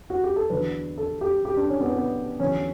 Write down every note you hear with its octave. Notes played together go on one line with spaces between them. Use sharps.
F#4
G4
A4
E2 D3 F#3 B4
A4
G4
G4
D4
C#4
B3
B3
E2 D3 F#3 C#4